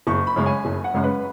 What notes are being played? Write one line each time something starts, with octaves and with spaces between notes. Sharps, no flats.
F#1 C#6
B5
F#2 C#3 G#3 C#4
G#5
F#1
F#5
F#2 C#3 G#3 C#4
B4